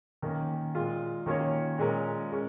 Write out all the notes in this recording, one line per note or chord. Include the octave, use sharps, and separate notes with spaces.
D#3 A#3 C#4
A#2 G#3 F4
D#3 A#3 C#4 F4 C#5
A#2 G#3 C#4 A#4
G#3 C#4